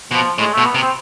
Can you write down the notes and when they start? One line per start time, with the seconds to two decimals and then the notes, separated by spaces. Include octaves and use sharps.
0.11 B2 F3
0.38 A2 G#3
0.53 A3
0.58 B2
0.65 B3
0.75 C3
0.80 C4